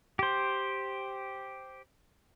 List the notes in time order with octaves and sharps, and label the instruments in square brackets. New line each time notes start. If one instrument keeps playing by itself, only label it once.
[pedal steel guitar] G4 C5